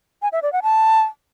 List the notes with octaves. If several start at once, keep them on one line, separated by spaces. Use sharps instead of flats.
G#5
E5
D5
F#5
A5